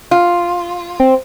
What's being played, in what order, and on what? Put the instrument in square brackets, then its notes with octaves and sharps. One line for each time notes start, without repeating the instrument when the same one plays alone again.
[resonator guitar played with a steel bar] F4
[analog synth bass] C4